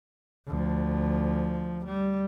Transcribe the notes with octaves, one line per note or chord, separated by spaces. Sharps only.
D2 F3
G3